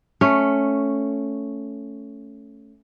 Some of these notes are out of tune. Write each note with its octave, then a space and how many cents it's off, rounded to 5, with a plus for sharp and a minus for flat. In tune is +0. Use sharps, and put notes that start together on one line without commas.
A3 +0 C#4 +0